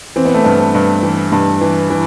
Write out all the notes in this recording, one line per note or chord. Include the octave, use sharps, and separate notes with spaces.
E3 C4
B3
A3
G2 B3
B3
G2
E3
G2
E3
E3